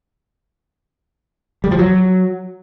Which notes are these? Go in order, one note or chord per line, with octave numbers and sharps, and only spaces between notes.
G3
F3
F#3